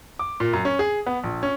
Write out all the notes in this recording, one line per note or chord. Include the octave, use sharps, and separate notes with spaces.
D6
A#2
F#2
C#4
G#4
B3
A#1
C#4